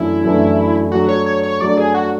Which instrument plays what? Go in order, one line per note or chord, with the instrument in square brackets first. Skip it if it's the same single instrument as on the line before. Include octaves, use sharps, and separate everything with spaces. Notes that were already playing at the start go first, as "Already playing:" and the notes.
Already playing: [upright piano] F#2 E3 A3 D4 [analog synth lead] E4
[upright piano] F#2 E3 A3 D4
[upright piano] F#3 A3 D4 [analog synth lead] F#4
[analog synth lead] C#5
C#5
C#5
[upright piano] F#3 A3 D4 [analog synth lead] D5
[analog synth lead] G#4
F#4